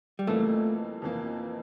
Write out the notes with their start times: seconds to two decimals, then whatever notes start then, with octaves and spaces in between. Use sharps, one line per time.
0.19 G3
0.27 F2 E3 A3 A#3
1.02 F2 E3 A#3